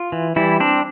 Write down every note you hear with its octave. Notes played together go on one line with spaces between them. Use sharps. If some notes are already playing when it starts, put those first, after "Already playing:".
Already playing: F4
E3
E3 G3 E4
C4 D4